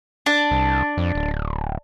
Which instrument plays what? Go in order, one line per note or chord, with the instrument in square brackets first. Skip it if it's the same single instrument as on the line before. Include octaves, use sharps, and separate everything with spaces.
[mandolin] D4
[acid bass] C2
F2
D1